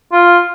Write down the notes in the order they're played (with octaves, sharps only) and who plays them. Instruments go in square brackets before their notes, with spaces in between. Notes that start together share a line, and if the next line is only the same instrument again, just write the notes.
[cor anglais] F4